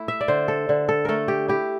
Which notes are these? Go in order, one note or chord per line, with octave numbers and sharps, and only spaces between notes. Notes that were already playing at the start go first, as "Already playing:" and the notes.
Already playing: A3 E4
E5
D5
D3 C5
A4
D3
A4
A3 A4 A#4
G4
E4 G4